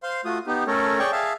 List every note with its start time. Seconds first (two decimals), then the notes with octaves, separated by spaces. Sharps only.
0.03 C5 F5 C6
0.25 A3 F4 F#4 D#6
0.47 B3 D#4 G4
0.67 A3 C#4 A4 A#4 C#5
0.99 G#4 C#5 D5 G5 C#6
1.12 G#4 E5 F5 A5